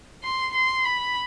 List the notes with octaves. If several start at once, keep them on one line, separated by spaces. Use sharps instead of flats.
C6
C6
B5